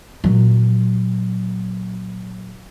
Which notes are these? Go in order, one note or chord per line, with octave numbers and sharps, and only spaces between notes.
A#2 F#3